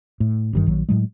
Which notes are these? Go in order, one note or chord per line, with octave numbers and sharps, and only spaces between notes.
A2
F#1 G2 D#3
A#1 D#3 F#3
A2 F#3 G#3